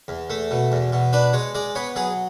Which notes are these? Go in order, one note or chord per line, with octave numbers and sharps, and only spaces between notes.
E2
A3
B2
E2
B2
D4 B4
G#3 C#5
G#3 D5
B3 C#5
F#3 G#4